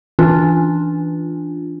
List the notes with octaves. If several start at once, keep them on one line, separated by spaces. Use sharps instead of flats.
E3 C#4 D4 F4